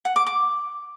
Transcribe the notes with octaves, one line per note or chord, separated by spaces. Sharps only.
F#5
D6
D6